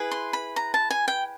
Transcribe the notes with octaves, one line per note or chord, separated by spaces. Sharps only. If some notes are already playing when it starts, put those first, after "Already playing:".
Already playing: E4 G#4 B4
C6
B5
A#5
A5
G#5
G5